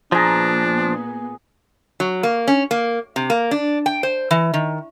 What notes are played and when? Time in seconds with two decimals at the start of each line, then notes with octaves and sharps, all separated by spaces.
0.12 A#2 F3 B3 D4 G#4 A#5
2.00 F#3
2.23 A#3
2.48 C#4
2.71 A#3
3.16 C3
3.30 A#3
3.51 D4
3.86 G5
4.03 C5
4.31 E3
4.54 D#3